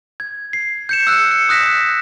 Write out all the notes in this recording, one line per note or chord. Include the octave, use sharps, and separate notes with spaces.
G#6
C7
G6 C#7 E7
E6 F#6 C#7
C#7
D#6 F#6 A#6 B6 E7